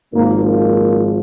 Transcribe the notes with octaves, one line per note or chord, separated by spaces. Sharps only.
G#1 G#2 F3 A#3
A#3